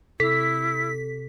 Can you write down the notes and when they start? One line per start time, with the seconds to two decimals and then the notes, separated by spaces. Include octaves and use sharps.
0.20 C3 E4 A4 B6